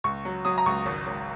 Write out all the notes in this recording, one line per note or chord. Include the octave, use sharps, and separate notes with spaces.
C#2 C#6
F#3
F#3 D#6
A#5
C#2 C#6
G#1
G#1